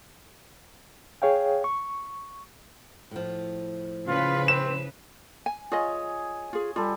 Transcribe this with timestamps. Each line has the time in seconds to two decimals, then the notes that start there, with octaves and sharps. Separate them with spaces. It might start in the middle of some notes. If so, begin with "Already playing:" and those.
1.22 G#4 C#5 F5 G5
1.64 C#6
3.11 A2 F3
4.08 C#3 F4 B4
4.48 C4 E7
5.46 G#5
5.72 F4 G#4 C#5 D#5 G#5
6.53 F4 G#4
6.76 G3 F4 A4